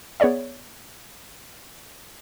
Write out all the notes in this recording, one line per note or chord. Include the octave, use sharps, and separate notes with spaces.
B3 G#4 C#5 D5 E5